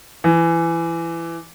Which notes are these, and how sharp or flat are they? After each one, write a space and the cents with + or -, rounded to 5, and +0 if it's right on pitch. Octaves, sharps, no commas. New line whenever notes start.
E3 +20